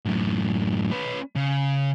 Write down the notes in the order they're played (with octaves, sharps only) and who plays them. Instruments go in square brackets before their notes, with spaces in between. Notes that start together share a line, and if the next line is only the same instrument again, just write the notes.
[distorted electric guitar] F#2 A2
C#4 B4
C#3